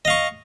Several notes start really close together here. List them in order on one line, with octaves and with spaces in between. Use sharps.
D#5 F5 C#6